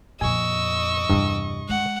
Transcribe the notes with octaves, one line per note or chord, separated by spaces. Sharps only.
F2 A#2 D#5 G#5 C#6 E6
E2 G2 C3
G#3 F#5